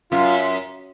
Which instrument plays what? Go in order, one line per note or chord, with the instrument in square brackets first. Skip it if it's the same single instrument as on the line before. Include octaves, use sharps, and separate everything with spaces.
[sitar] F#2 [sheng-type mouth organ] F4